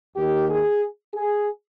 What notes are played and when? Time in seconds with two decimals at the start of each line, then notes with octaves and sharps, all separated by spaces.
0.16 D#2 D#3 G4
0.50 G#4
1.14 G#4